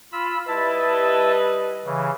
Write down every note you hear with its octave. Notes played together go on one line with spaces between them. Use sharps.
F4 B5 E6
G3 E4 B4 D#5 E5 A5
C#3 E3